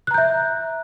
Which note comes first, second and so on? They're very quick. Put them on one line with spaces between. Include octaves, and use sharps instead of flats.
F#6 A#5 G6 E5